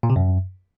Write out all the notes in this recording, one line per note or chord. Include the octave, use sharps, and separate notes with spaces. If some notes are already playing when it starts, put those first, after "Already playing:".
A#2
C3
F#2